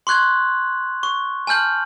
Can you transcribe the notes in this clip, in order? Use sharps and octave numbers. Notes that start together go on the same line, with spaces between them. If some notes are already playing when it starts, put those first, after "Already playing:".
C6 C#6 F#6 G#6 F#7
C#6
G#5 A5 F6 G6 F#7